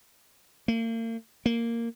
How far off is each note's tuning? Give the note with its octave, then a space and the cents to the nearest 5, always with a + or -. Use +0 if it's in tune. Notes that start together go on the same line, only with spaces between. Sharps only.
A#3 -40
A#3 -10